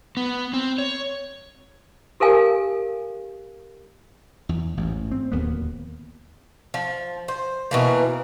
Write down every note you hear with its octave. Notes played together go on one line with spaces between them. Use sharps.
B3
C4
C#5
G4 A4 A#4 F5 G#5
E2
A1 G#2
C4
D1 D#2 A#3 B3
F3
C5
B2 E3 A#3